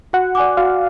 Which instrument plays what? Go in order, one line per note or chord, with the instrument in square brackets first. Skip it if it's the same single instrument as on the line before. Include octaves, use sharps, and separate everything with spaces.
[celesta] F#4 [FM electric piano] F#5
[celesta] D5 G#5 D6
[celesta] F#4 [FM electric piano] F5